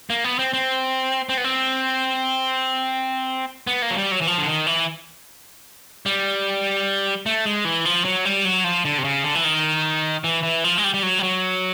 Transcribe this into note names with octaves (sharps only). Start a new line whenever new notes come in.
A#3
B3
C4
C4
C4
B3
C4
B3
A#3
F#3
G3
F#3
E3
F3
D3
D#3
E3
G3
A3
G#3
E3
F3
F#3
G3
F#3
F3
D3
C3
C#3
D3
E3
D#3
E3
E3
F3
G#3
G3
G3
F#3
G3
F#3